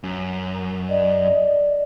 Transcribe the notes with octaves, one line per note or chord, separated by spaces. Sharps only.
F#2
D5 D#5